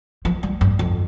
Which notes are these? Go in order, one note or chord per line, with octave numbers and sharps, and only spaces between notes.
F3
G3
G2
F2